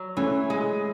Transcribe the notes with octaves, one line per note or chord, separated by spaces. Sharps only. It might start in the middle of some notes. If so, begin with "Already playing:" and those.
Already playing: F#3
E3 A3 C#4
G#3